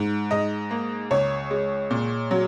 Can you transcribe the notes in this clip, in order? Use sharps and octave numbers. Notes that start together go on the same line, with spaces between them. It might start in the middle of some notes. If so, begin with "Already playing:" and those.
Already playing: G#2
G#2 D#5
A#3
C#2 C#5
G#3
A#2
F#3